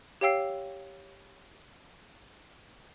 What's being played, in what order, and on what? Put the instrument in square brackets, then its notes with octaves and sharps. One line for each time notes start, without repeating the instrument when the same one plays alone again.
[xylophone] G4 C#5 F5 G5 E6 C7